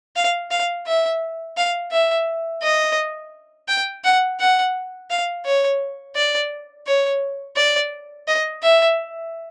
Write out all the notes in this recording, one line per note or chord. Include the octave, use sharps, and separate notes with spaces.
F5
F5
E5
F5
E5
D#5
G5
F#5
F#5
F5
C#5
D5
C#5
D5
D#5
E5